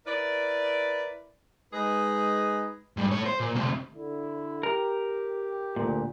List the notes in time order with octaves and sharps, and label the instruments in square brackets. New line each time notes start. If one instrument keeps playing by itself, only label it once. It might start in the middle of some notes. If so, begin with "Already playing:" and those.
[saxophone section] E4 A#4 B4 D5
G#3 D#4 G#4 B4
[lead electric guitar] G#2 G3
A2 C#5
C5
A#2
D2 C3
[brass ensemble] D3 E4
[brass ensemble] G4 [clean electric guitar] A#4
[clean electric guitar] D2 A#2